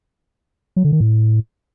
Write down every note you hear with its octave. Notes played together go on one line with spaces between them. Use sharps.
F#3
D3
D#3
A2